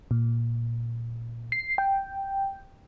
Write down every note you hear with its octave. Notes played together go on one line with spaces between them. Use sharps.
A#2
C7
G5